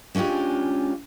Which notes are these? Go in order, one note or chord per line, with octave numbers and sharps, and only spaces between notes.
G#3 C#4 D4 F4 G4